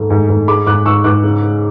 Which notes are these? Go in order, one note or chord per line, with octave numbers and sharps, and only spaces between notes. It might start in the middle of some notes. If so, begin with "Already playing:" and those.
Already playing: G#2 A3
G#2
G#2
G#3 B5 D6
G#2 D6 F#6
G#2 C#6 E6
G#2 D6 F#6
C#3
G#3